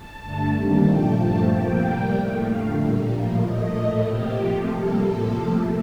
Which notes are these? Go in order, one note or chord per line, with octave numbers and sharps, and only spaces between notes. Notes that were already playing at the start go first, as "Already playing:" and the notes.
Already playing: A5
G2 D3 A3
C3 D#3 G3 A#3
A#2 F3 A3 G5
G2 F3 A3 A5
C3 F3 A#3 G5
A2 G3 A#3
A2 A3
F2 D3 A3 F5
A#2 G3 A#3
A2 F3 A#3
A#2 A3 D#5
A2 A3
C3 F3 A#3 G4
C3 F3 A3
C3 G3 A#3 A4
A2 F3 A#3 A4
C3 F3 A3